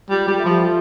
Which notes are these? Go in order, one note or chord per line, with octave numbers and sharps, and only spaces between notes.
G3 F4
G3
A4 E5
F3
F4